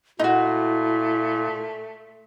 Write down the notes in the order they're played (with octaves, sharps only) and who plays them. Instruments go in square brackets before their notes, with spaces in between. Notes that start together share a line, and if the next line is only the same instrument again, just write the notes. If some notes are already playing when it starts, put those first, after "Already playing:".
[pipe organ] A#2 [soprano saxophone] A3 [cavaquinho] D#4 F#4 [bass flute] E4